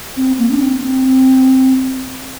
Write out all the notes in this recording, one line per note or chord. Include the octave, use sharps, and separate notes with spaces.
C4
A#3
D4
C4
C4